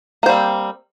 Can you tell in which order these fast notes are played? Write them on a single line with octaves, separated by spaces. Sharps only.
A#3 C5 G3 C4